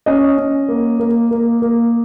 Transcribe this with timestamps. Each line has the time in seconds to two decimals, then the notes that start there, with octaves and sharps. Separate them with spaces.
0.06 C#4 D#5
0.38 C#4
0.69 A#3
1.00 A#3
1.31 A#3
1.62 A#3